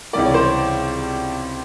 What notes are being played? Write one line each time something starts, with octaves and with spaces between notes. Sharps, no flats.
C#2 C3 E3 G3 D5
C#5
C5
C#5